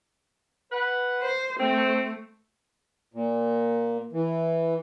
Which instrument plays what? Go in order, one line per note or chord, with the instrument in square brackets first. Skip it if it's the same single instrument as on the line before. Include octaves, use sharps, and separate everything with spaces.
[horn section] B4 F#5
[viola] C5
[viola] A3 [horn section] C4
[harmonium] A#2
E3